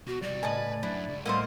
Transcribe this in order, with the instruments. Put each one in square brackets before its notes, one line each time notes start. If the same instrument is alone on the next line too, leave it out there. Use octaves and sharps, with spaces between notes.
[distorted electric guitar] B2 [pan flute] F#4
[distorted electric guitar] C3 G3 [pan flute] D5
[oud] A2 C#3 D#5 [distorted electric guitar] A#4 B4 [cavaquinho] G#5 A5
[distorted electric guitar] F#2 [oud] D4 [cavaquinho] E4
[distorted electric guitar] C#2
[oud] A2 A#3 [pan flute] G3 [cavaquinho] C5 E5 F#5 [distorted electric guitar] D#5